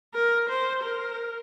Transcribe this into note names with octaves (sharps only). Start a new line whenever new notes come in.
A#4
C5
A#4